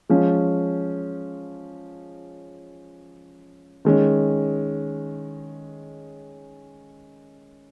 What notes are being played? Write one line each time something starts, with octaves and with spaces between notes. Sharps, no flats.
F3 G#3 C#4
D#3 G#3 C#4